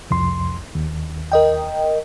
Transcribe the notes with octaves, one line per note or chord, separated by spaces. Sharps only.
C2 F2 C6
D#2
A#4 D#5 G5